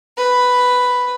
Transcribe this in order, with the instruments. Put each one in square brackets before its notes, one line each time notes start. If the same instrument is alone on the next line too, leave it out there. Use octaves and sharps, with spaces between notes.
[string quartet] B4